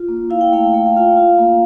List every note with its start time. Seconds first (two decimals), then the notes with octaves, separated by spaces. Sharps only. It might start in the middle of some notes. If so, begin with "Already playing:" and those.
Already playing: F4
0.08 A#3
0.30 E4 F5
0.41 G5
0.53 A3 F5
0.64 G5
0.74 A3 F5
0.86 G5
0.97 F4 F5
1.16 F4 F5
1.38 A#3